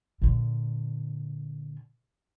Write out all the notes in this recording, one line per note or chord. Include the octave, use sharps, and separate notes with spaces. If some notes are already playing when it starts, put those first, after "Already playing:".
A#2 D3